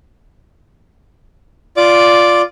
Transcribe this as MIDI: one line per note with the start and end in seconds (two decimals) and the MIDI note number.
1.77 2.42 65
1.77 2.42 74
1.77 2.42 86